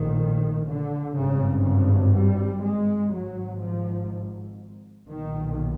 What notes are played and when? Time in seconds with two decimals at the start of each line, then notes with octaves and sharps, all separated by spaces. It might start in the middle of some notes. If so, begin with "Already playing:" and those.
Already playing: A#1 A2 D#3
0.67 D3
1.16 G#1 G2 C#3
1.65 C#3
2.15 G3
2.64 G#3
3.13 G#1 G#2 F#3
3.62 F3
5.09 B1 A#2 D#3